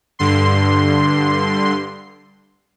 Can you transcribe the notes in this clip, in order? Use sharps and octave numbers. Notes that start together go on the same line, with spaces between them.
G2 D3 C6